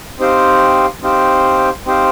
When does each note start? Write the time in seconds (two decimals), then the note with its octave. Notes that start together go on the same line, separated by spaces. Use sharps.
0.19 C4 D#4 G4 C5 F5
1.03 C4 D#4 G4 C5 F5
1.86 C4 D#4 G4 C5 F5